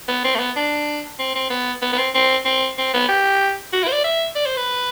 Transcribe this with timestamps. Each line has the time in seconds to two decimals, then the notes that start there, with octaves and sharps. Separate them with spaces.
0.08 B3
0.24 C4
0.35 A3
0.39 B3
0.56 D4
1.19 C4
1.35 C4
1.50 B3
1.82 B3
1.93 B3
1.98 C4
2.15 C4
2.45 C4
2.78 C4
2.94 B3
3.09 G4
3.73 F#4
3.84 E4
3.88 C5
3.93 D5
4.04 E5
4.35 D5
4.46 C5
4.57 B4